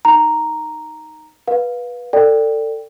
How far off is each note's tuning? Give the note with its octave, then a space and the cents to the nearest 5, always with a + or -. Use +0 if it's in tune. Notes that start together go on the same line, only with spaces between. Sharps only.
D#4 +0 A#5 +0
B4 -15 F5 +20
A4 +30 D5 +0 G5 +0